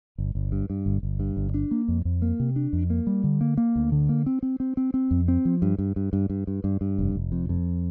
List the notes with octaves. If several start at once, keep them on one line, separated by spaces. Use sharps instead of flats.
G1
G1
G2
G2
G1
G1
G2
G1
D4
A#3
F2
F2
A#3
C3
D4
F2
A#3
G3
D3
A#3
A#3
D2
D3
A#3
C4
C4
C4
C4
C4
F2
C4
F3
G2
G2
G2
G2
G2
G2
G2
G2
F1
F1
F2
F2